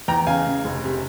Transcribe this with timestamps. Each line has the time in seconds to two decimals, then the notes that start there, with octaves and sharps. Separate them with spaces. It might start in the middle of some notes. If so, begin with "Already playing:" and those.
0.08 E2 G5 A#5
0.27 C#3 F5 G#5
0.47 C#3
0.65 F1
0.84 C3